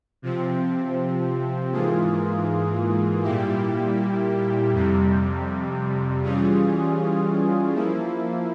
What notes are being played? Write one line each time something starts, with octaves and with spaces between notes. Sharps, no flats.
C3 F3 C4
G#2 E3 A#3 F4 G#4
A#2 G3 A#3 E4 G4
F2 C3 G3
E3 G3 C#4 F4 G#4
F3 A#3 E4